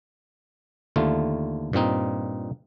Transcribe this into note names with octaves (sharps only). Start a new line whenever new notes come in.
D#2 D3 A3 F4
G2 A#2 C4 D#4